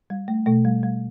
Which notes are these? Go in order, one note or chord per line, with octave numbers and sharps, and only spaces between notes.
G3
A3
B2 A3
G3
G3